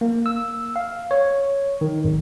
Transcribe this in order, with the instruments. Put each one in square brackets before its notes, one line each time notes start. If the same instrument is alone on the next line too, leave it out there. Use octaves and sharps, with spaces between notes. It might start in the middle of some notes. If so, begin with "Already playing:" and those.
[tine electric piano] A#3
E6
F5
C#5
D#3
G#1